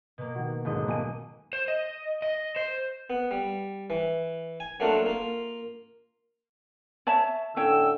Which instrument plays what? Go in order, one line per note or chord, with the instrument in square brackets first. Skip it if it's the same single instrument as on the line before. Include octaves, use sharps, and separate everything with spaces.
[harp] B2 A#3
[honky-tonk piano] D#3 F#4
[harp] D#1 D#5 [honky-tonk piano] G#2 D3 F#3
[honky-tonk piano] B1 G#5 D#7 [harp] A#3
[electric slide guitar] C5
D#5
D#5
C5
[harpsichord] B3
G3
E3
G#5
F#3 A3 A#3 D4 F4
A#3 F4
[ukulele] C#5 E5 A5
[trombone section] A2 D3 [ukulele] C#4 C#5 G5 [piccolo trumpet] E6